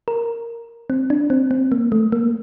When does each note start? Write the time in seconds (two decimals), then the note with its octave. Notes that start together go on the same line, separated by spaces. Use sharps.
0.08 A#4
0.90 C4
1.10 D4
1.30 C4
1.51 C4
1.72 A#3
1.92 A3
2.12 A#3